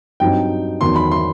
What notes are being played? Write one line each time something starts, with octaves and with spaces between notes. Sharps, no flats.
G2 F#3 C4 D#4 G5
E2 D#3 F#3 C6
B5
C6